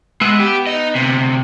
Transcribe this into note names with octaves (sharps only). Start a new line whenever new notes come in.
G#3 B3 B4 E5
G4
D#4 D#5
D2 C3